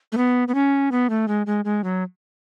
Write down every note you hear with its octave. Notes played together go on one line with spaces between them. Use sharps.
A3
B3
B3
C#4
B3
A3
G#3
G#3
G#3
F#3